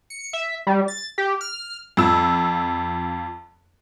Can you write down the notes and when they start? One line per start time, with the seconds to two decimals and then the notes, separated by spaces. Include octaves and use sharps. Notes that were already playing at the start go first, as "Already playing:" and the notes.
0.10 C#7
0.33 E5
0.67 G3
0.88 A6
1.18 G4
1.41 F6
1.97 F2 F3 E6